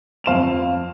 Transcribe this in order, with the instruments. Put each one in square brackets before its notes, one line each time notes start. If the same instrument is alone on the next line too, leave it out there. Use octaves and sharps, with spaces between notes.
[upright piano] F2 F5 E7 F7